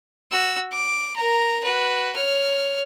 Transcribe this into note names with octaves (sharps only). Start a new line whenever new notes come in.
F#4 E6
D6
A#4 A#5
F#4 B4
C#5 F6